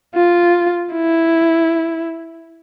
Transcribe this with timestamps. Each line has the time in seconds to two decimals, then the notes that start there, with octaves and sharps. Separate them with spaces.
0.15 F4
0.94 E4